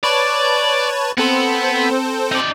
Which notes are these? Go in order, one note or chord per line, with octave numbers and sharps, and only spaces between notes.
B4 C#5 D5 A5
B3 C4 A4 C5
D#4 D5